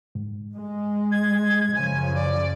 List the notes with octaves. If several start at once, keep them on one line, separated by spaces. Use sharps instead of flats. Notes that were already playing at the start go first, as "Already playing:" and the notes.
G#2
G#3
G#6
F#2 C#3 F3 G#5
D5